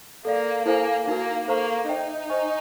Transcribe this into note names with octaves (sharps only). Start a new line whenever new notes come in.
A#3 A4 D5 F5
A#3 E4 A4 C5 F5 G#5
A#3 D#4 F#4 A#4
A#3 A4 C5 F5 A#5 C#6
D#4 C5 E5 G5
C5 D#5 G#5 C#6